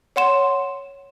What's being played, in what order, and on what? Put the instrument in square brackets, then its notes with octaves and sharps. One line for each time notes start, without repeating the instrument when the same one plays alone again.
[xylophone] C#5 F#5 C6 E7